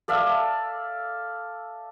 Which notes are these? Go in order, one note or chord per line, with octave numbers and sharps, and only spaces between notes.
A4 D5 E5 F5